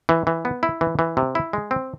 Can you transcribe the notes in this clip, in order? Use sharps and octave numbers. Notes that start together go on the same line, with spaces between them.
E3
E3
B3
E4
E3
E3
C3
E4
G#3
C4